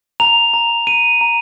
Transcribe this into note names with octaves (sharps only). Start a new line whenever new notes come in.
A#5 F7
A#5
A#5 D#7
A#5